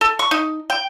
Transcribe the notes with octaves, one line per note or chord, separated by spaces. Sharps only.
A4
C#6
D#4
G5